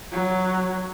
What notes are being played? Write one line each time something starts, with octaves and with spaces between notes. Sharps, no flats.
F#3